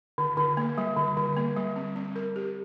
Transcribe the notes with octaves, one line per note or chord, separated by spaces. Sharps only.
D3
D3
A#3
G3
D3
D3
A#3
G3
C4
C4
A#4
G4